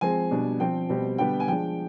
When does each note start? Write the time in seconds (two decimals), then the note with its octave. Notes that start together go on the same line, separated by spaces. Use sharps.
0.01 F3 G#3 C4 G#5
0.31 B2 G3 D4
0.60 F3 C4 G5
0.89 B2 G3 C4
1.18 D3 G3 B3 D4 G5
1.40 G#5
1.48 F3 G#3 D4 G5